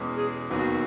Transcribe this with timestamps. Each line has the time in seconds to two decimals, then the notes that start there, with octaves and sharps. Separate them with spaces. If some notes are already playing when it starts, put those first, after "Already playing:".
Already playing: E2 B2 G#3 C#4
0.16 G#4
0.50 E1 D#2 D#3 F#3 B3 F#4